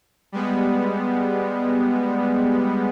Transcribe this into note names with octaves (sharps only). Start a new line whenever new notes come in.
G3 G#3 B3